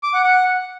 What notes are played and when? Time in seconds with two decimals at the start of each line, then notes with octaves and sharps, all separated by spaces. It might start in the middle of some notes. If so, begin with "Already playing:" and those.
0.03 D6
0.14 F#5
0.24 F#5